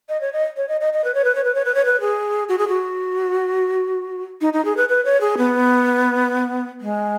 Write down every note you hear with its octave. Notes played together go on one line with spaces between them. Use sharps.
D#5
C#5
D#5
C#5
D#5
D#5
D#5
B4
C#5
B4
C#5
B4
C#5
B4
C#5
B4
G#4
F#4
G#4
F#4
D#4
D#4
G#4
B4
B4
C#5
G#4
B3
G#3